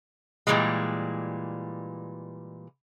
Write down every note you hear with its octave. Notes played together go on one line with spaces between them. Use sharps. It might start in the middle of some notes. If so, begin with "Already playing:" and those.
A#2 C#3 E3 G3 G#3